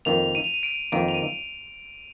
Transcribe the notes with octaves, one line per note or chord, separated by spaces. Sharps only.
F2 D#3 A#3 F7
D#7
F7
D#7
D7
F2 D#3 A#3 D7
F7
D#7